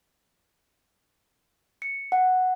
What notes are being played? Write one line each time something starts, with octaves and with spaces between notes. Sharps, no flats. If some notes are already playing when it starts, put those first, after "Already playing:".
C#7
F#5